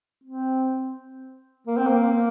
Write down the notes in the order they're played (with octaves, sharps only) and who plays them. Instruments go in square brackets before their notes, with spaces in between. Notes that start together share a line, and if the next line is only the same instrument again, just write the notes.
[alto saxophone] C4
A#3
C4
A#3